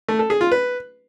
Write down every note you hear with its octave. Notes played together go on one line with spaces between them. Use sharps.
A3
A4
G#4
F4
B4